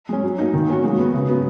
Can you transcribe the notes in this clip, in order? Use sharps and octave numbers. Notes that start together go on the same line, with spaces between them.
G#3 C#4
F#3
A#3 D#4
D#3
A#3 C#4 F#4
G#3
B3 F#4
C#3
F#3 B3